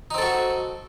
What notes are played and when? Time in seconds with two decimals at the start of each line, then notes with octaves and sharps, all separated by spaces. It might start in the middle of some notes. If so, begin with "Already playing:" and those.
0.11 D#4
0.14 C4
0.18 A4
0.22 F#4